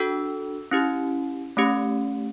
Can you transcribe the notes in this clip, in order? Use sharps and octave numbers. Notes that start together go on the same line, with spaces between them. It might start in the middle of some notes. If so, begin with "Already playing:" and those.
Already playing: D4 F#4 A4 E6
C#4 E4 G4
A3 C#4 G4